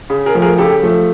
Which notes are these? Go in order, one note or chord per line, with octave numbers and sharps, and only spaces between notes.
C#3
G#4 A#4
F3 A3
G#4 A#4
C#3 G4 A4
F3 A3